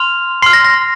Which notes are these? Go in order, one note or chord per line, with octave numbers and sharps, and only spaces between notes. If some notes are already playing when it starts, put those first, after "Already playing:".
Already playing: C6 F6 F7
C6 F6 C7
A#6
A#6